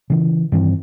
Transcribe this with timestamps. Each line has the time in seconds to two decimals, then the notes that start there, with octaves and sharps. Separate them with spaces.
0.10 C#3 E3
0.52 G2 D#3 E3 C4